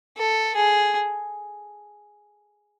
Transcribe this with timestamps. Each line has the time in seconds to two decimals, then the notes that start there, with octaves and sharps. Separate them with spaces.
0.17 A4
0.56 G#4